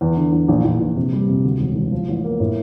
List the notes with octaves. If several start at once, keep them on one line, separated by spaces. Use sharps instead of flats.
E2
D3
E2
A#1
A#1
A#1
C3
G3
C3
D2
E1
E1
F3
A1
A#3
A2